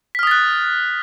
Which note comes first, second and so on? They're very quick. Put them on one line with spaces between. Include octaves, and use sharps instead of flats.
B6 F6 D#6 A6 F#6